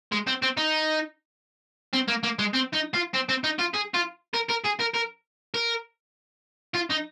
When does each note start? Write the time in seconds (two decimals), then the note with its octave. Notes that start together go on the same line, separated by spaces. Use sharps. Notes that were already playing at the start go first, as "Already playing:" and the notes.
0.12 G#3
0.27 C4
0.42 C4
0.57 D#4
1.93 C4
2.08 A#3
2.23 A#3
2.39 G#3
2.53 C4
2.73 D#4
2.94 F4
3.14 C4
3.29 C4
3.44 D#4
3.59 F4
3.74 G#4
3.94 F4
4.34 A#4
4.49 A#4
4.64 G#4
4.79 A#4
4.94 A#4
5.54 A#4
6.75 F4
6.91 D#4